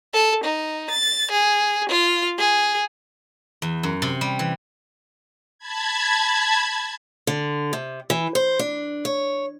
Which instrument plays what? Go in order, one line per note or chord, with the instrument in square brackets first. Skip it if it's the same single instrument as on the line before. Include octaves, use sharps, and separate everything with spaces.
[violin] A4
D#4
A6
G#4
F4
G#4
[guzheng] E2
F#2
C3
G3
E3
[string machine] A5 B5 G#6
[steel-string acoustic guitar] D3
C3
E3
C5
D4
C#5